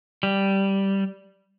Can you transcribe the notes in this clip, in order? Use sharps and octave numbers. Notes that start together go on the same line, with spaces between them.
G3